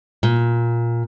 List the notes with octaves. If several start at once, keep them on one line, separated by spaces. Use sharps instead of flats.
A#2